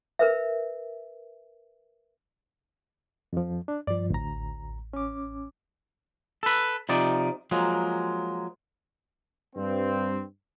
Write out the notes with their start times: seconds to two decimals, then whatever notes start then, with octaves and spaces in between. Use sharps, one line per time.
0.19 A#4 B4 E5
3.33 F2 F3
3.68 D4
3.87 G2 F3 D5
4.10 A1 D2 A#5
4.93 C#4 D6
6.43 A4 B4
6.89 C3 F3 D#4 D5
7.51 F3 F#3 G#3 A#3
9.56 G2 C4